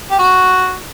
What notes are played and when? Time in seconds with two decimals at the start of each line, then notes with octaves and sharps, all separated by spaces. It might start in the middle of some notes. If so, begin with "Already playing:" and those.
0.11 G4
0.19 F#4